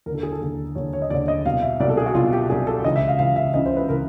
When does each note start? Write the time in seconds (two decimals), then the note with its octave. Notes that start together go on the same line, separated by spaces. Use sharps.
0.06 D#2 A#4
0.10 D3
0.15 A4
0.23 G#4
0.32 A4
0.41 D#2 D3
0.75 D#2 D3 C#5
0.93 C#5
1.02 D#5
1.10 D#2 D3 D5
1.28 D#5
1.45 C2 B2 F5
1.62 E5
1.80 C2 B2 D5
1.89 A4
1.97 G#4
2.06 F#4
2.15 C2 B2 F4
2.33 G4
2.50 C2 B2 G#4
2.67 A4
2.84 C#2 C#3 E3 D#5
2.96 E5
3.08 F5
3.19 C#2 C#3 E3 F5
3.36 E5
3.54 C#2 C#3 E3 D#5
3.66 C5
3.77 B4
3.89 C#3 E3 A#4